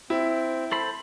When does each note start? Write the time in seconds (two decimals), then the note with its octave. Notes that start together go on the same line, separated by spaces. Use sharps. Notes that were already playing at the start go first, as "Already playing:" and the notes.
0.10 C4 E4
0.72 A4 C5 B5